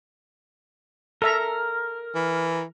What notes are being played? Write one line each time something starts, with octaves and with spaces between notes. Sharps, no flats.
A4 A#4 E5 A#5
E3